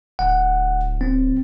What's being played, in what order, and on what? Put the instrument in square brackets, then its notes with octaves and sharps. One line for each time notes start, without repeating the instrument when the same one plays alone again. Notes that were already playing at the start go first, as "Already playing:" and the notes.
[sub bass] D1 [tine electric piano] F#5
[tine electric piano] C4